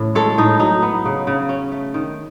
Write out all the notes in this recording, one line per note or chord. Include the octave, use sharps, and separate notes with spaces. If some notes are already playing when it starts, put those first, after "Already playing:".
Already playing: A2 C#3 E3
G#3 A4 C#5
A2 D#4
F#3 D#4
B3
C#3
C#3
C#4
A3
D#3